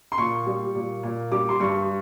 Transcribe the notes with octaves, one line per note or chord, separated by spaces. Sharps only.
C6
A#2 C#6
G3
A#2
A#2
G3 D6
C6
G2 C#6